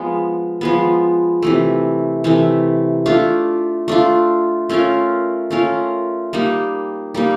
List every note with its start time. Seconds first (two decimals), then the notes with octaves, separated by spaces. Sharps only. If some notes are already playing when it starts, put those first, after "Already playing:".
Already playing: F3 G#3 B3
0.61 F3 G#3 B3
1.42 C3 E3 A3
2.24 C3 E3 A3
3.06 A3 D4 F4
3.88 A3 D4 F4
4.69 A3 C#4 F4 A#4
5.51 A3 C#4 F4 A#4
6.33 G3 A#3 D#4
7.14 G3 A#3 D#4